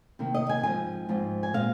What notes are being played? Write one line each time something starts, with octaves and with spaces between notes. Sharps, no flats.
C3 D#3 A#3
D#5
G#5
G#2 F3 C4 G#5
G#2 F3 C4
G#5
A#2 G#3 C4 F5